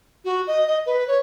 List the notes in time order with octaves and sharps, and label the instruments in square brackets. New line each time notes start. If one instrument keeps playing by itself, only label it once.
[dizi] F#4
D#5
D#5
B4
C#5